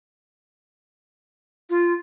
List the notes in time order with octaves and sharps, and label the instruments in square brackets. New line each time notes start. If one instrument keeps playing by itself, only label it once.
[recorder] F4